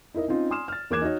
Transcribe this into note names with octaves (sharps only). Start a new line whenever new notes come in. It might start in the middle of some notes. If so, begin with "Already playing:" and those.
D#4 E4 A#4 D#5
C4 C#4 D#4 F4
G#5 C6 D#6 F6 E7
F6 A6
E2 A#3 D6 F#6 G#6 E7
D#4 F#4 C#5 D#5